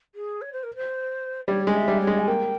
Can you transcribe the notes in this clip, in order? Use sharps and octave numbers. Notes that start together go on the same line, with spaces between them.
G#4
C#5
C5
A#4
C5
G3 C#5
G#3 C#5
E5
G3
C#5
G#3
G#5
A#3 G5